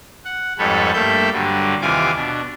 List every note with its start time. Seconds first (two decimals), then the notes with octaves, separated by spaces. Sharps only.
0.25 F#5
0.59 F2 G#2 G3 A4 B4 C#5
0.93 G2 A3 A#3 A4 E5 G6
1.32 G2 D3 F#3 G3
1.82 D#2 C3 E3 F4 G#5 D6
2.15 B2 D4